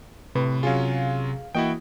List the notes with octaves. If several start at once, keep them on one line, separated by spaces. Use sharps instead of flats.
A2 C3 B4
F#3 C#4 F4 G#4 F5
E3 A#3 E4 F#4 D#5 G5